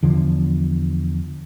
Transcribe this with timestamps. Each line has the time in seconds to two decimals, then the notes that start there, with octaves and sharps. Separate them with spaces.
0.03 E2 D3 F3